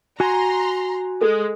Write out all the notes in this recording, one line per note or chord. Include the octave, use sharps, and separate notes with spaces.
F#4 G#5 A#5 C6
G#3 A4